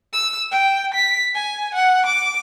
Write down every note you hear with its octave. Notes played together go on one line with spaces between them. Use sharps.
E6
G5
B6
G#5
F#5
D6